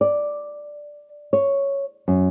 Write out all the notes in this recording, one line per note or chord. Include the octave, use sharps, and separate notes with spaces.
D5
C#5
F#2